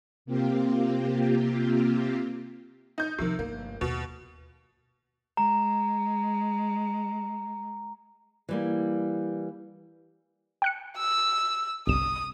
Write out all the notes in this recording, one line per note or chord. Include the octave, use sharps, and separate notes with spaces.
C3 A#3 C4 F4 G4
D#4 G6
C3 D#3 F3 C4
G1 A3 A#3
D#2 B2
G#3 A#5
E3 G3 A#3
G5 F#6 C#7
E6
G1 C2 D#6 E7